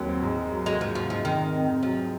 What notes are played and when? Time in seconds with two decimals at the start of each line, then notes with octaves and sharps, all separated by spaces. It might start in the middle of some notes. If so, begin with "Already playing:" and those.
Already playing: D#2 F#3
0.09 C4
0.22 G#2
0.37 G#2
0.52 F#3
0.66 G#3 F#4
0.81 G#2 F3
0.95 F3 F#4
1.10 G#2 F3
1.24 F1 D#3
1.39 C3
1.54 F2
1.68 F2
1.83 F3 F#3